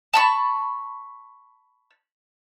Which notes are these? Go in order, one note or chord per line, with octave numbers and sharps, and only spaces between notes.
A5 B5 C#6